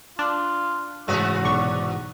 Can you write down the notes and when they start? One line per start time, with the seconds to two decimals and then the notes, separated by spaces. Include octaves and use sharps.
0.19 D4 F4
1.08 G#2 C3 E3 A3 B3 F#4
1.44 B1 D5 C#6